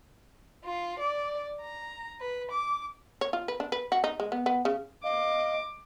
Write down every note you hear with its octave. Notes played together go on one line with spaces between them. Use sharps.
F4
D5
A#5
B4
D6
C#5
F4
B4
D4
B4
F#4
D#4
G#3
B3
B3
C#3
D#5 F5 D6